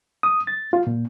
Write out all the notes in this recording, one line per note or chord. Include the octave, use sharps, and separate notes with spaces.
D#6
A6
F4
A#2